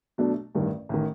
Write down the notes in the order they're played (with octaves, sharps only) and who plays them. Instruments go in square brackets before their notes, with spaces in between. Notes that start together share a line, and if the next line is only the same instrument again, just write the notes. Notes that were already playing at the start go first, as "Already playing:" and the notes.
[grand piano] B2 F#3 A3 D4
A1 G2 D#3
A1 D#3